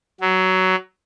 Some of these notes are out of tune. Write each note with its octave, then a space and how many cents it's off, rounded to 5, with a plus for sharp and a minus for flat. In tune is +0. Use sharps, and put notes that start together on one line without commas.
F#3 +15